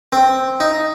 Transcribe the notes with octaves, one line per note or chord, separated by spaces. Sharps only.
C4
D#4